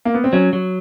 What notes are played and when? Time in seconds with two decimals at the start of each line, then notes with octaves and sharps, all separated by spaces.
0.05 A#3
0.14 B3
0.24 C4
0.33 F#3 C#4
0.53 F#3